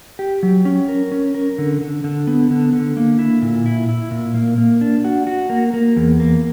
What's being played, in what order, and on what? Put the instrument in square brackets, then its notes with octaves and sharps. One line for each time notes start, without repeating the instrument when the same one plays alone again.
[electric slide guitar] G4
F#3
C#4
A#4
C#4
A#4
D3
D3
D3
B3
D3
D3
A#3
E4
A#2
E4
E4
A#2
A#3
A#3
D4
F#4
F#4
A#3
A#3
E2
A#3